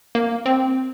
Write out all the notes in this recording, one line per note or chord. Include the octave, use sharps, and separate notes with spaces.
A#3
C4